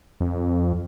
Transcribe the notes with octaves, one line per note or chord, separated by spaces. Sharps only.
F2